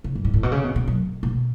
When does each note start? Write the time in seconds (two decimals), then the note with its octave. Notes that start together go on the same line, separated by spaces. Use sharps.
0.04 C#3
0.15 F#2
0.25 G#2
0.34 A2
0.43 B2
0.52 C#3
0.64 B2
0.76 B2
0.88 F#2
1.23 B2